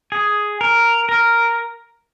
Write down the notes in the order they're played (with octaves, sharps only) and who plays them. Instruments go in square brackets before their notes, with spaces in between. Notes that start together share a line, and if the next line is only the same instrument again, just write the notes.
[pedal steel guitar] G#4
A#4
A#4